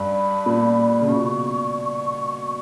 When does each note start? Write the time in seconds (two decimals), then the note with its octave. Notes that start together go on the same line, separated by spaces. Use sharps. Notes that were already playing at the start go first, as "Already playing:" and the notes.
Already playing: G2 B5
0.46 A#2
1.01 C#3
1.08 B2 C#6